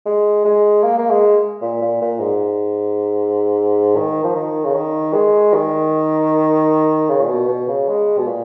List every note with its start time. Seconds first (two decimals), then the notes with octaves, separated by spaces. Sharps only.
0.06 G#3
0.45 G#3
0.83 A#3
0.98 A#3
1.10 G#3
1.61 A#2
1.82 A#2
2.01 A#2
2.20 G#2
3.96 D#3
4.23 F3
4.35 D#3
4.65 C#3
4.75 D#3
5.13 G#3
5.53 D#3
7.10 C#3
7.21 A#2
7.29 B2
7.48 B2
7.68 C#3
7.88 G#3
8.18 B2
8.27 A#2